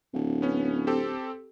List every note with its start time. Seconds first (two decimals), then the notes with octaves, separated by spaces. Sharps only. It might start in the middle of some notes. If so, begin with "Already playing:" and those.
0.14 D1
0.42 B3 C#4
0.87 C4 G4 A4